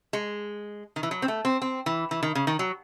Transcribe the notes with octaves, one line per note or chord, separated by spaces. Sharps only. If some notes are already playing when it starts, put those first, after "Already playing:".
G#3
D#3
E3
F#3
C4
A3
C4
C4
E3
E3
D#3
C#3
D#3
F#3